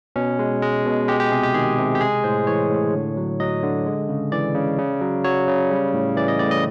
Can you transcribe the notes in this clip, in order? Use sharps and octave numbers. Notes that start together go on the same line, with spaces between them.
B2 C#4
G#3
G#3
B2
G#3 G4
G4
C3 G#4
G4
D#3 G#4
C3
G4
G#3 G#4
A2 C5
E3 C#5
A2
D3
F#3
F#3 D#5
D3
G#3
C#3
E3 D5
C#3
C#3
F#3
F#3 C#5
C#3
G3
A2
E3 D5
D#5
A2 D5
D#5